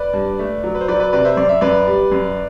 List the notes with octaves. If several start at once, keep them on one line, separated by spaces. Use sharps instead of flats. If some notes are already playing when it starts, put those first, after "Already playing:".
Already playing: B4 D5
G2
A3
F#3
B4
C5
F#3 B4 D5
B4 D5
C3 B4 D5
C5 E5
F#2 D5
E5
F#2 B4 D5
G3
F#2